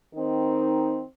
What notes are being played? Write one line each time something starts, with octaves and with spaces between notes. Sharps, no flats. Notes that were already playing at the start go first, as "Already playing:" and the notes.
D#3 C4 D#4